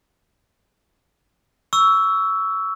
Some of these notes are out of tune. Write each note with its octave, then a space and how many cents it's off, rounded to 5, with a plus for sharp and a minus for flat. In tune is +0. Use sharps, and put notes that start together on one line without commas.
C#6 +25 E6 +0